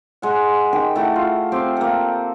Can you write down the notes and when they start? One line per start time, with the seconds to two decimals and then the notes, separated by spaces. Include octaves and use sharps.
0.22 G#3 F#5
0.73 D#3 G4 G5
0.96 A3 E4 F#5
1.16 F4
1.52 C4 G4 F5
1.77 A#3 A4